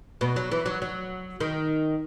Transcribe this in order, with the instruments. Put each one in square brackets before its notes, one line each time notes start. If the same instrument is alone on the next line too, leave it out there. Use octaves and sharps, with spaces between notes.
[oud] B2
F#3
E3
F#3
F#3
D#3